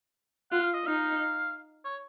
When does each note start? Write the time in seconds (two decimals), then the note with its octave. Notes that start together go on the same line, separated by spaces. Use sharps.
0.51 F4 F#5
0.63 F5
0.74 D#5
0.85 D#4 F5
1.85 C#5